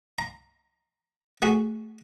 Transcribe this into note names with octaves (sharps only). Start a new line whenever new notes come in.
A#5
A3 F#4 G#4